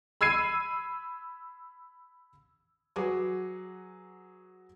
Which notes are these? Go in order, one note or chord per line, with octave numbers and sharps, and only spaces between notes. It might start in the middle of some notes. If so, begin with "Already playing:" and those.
B5 E6 G#6 C7 D#7
F#3 F#4 G#4 B4 D6